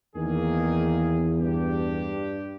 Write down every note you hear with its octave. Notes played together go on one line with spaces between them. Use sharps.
E2 D#3 A#3 G#4
G2 D4 G4